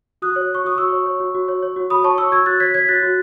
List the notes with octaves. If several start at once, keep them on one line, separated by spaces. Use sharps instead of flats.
F#4 D#6 F#6
C#5
C#5 C#6
F#4 D#6
F#4 C#6 E6
C#5
C#5
F#4
F#4
C#5
C#5
F#4
F#4 B5 D#6
C#5 A5 C#6
C#5 C#6 E6
F#4 E6 G#6
F#4 F#6 A6
C#5 G#6 B6
C#5 G#6 B6
F#4 F#6 A6
F#4